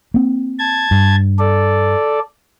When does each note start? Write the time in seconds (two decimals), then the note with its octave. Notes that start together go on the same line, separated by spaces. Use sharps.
0.14 A#3 C4
0.59 A5 G#6
0.91 G2
1.39 A4 D5